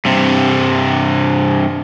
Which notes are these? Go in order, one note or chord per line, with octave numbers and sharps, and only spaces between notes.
G2 C3